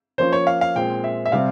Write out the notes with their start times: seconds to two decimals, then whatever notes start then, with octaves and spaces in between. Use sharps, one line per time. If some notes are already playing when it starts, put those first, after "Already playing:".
0.18 F3 A#3 C#4 F4 C5
0.33 C#5
0.47 F5
0.61 F5
0.75 A#2 G#3 C4 G5
1.04 E5
1.26 E5
1.32 C3 G3 C4 F5